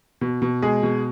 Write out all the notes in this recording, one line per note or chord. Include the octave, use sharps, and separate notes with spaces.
B2
B2
G#3 G#4
B2